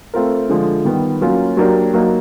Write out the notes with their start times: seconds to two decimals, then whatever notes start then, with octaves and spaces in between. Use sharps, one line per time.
0.14 A3 C4 F4 A#4
0.50 D3 F3 G#3
0.85 D#3 G3 B3
1.21 F#3 A#3 C#4 F4
1.57 F#3 A#3 D4 G4 A#4
1.94 F#3 A#3 D#4